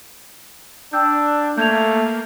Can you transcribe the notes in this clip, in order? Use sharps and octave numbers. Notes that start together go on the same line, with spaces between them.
D4 G5 E6 G6
A3 A#3 G6 G#6 F7